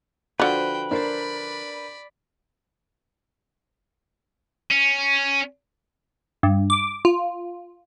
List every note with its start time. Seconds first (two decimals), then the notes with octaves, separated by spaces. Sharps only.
0.40 D3 F3 F#4 B4 C5 G5
0.91 D4 A#4 C5 D5 B5
4.71 C#4
6.43 G2
6.70 D6
7.05 F4